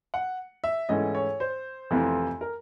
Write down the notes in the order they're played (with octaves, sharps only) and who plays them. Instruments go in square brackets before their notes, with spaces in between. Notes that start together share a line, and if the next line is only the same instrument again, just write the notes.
[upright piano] F#5
E5
[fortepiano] G#2 E3 A3 C#4 [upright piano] D#5
[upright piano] C#5
C5
[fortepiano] F2 C3 E3 A3
[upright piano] A#4